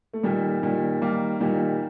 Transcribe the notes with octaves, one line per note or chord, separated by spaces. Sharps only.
A3
A#2 D#3 G3
A#2 D#3 G3
D#3 G3 A#3
A#2 D#3 G3